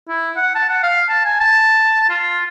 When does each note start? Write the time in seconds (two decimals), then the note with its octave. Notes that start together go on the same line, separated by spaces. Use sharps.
0.08 E4
0.36 F#5
0.55 A5
0.69 F#5
0.83 F5
1.09 A5
1.25 G#5
1.40 A5
2.10 F4